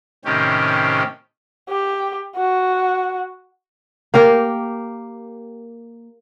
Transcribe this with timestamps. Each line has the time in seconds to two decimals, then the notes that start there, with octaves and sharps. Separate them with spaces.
0.25 A2 C3 D#3 C#4 G4
1.69 G4
2.36 F#4
4.14 A#3 G4 A#4 G5